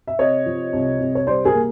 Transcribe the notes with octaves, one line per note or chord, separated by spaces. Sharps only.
E5
C3 C#5 D#5
F3
C2
C2
C#5
G3 C5 D5
G#4 A#4
A#3